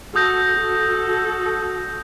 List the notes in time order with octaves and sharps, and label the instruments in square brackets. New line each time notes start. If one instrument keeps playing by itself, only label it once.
[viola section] F#4 A4 [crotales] D#6 G6 A#6
[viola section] F#4 A4